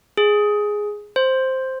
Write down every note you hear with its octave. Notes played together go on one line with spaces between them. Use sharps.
G#4
C5